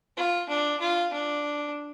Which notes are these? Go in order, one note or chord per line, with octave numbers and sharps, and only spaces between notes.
F4
D4
F4
D4